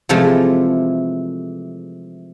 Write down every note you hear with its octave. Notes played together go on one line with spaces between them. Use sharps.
C3 E3 F3 G#3 A3